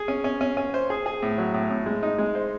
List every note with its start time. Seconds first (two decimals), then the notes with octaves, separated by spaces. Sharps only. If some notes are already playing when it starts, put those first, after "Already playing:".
Already playing: G#4
0.08 C#4
0.24 C#4
0.41 C#4
0.57 C#4
0.74 C5
0.90 G#4
1.06 G#4
1.22 A2
1.38 F#3
1.54 A2
1.70 A2
1.86 G#3
2.03 D#4
2.18 G#3
2.35 C5